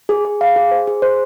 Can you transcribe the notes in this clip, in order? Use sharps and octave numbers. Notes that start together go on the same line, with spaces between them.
G#4
G#4
F5
G#4
C5
G#4
C5